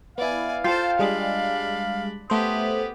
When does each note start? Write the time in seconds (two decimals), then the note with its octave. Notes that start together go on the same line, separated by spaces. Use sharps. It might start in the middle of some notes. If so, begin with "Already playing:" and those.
0.18 B3 E4 D5 F5 G#5
0.64 F4 A4 C5 G5
0.99 G3 G#3 D4 G#4 B5
2.30 A3 B3 G4 C5 D#6